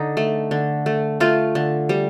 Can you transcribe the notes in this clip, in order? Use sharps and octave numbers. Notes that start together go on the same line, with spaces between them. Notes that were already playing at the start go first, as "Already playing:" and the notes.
Already playing: D3 D#4
A3
D3
A3
A3 F4
D3
G3